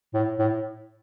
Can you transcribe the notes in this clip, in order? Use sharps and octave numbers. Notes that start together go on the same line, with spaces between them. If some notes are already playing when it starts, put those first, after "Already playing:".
A2
A2